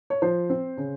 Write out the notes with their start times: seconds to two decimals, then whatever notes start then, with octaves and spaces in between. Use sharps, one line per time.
0.10 C#5
0.22 F3 C5
0.50 C4
0.77 C#3